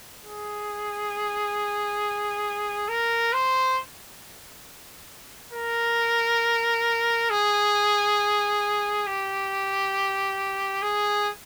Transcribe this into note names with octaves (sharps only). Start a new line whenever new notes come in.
G#4
A#4
C5
A#4
G#4
G4
G#4